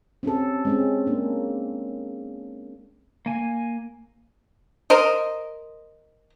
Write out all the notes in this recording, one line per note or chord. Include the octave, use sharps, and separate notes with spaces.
C4 C#4 G4 A4
G#3 C4 C#4
A#3 D4
A#3 G#5
A#4 C5 D#5